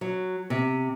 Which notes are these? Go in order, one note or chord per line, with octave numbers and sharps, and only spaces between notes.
F#3
C3